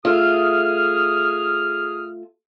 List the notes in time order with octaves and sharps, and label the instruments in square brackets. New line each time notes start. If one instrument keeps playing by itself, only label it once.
[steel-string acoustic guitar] A3 F4 [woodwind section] G#4 D#6 F6